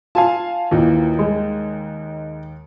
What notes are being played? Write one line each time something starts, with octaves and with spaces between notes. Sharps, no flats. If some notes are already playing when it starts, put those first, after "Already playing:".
F4 F5 G#5 A5
D#2 A#2 E3 D#4
G#3